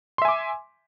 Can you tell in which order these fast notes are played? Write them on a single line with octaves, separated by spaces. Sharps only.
C6 E5 G#5 D6